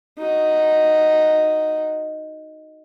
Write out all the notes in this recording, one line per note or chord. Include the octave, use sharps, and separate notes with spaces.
D#4 F#4